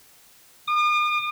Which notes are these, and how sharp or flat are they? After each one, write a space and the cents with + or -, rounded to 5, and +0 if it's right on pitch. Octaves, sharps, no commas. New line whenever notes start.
D#6 -45